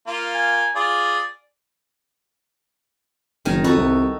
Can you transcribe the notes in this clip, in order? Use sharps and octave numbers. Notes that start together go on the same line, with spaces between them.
A#3 F4
G#5
F4 G#4 D5
F#1 D#3 A#4 G#5
F2 B3 F#4 A4
C2